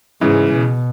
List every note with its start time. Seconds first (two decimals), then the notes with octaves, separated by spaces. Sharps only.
0.21 G#2 C#3 E3
0.53 B2